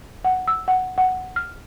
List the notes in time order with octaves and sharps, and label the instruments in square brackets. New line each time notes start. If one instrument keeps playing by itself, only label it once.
[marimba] F#5
E6
F#5
F#5
F6